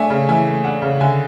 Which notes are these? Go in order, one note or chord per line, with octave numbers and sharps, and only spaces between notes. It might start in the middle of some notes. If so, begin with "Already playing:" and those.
Already playing: A3 D4 E5 G#5
C#3
E3 E5 G#5
A3
D4 F#5
C#3
D3 E5 G#5